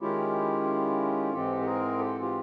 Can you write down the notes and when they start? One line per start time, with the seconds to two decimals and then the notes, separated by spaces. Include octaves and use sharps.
0.01 D#3 G#3 C#4 E4 F4 G4
1.33 G#2 E3 G#3 C4 G4 A4
1.62 A4
1.66 G#4 A#4
1.99 G4 A4
2.21 F4 G4